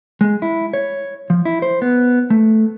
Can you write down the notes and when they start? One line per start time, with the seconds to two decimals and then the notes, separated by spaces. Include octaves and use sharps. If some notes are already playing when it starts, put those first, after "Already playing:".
0.21 G#3
0.42 E4
0.73 C#5
1.30 F3
1.45 E4
1.62 C5
1.82 B3
2.30 A3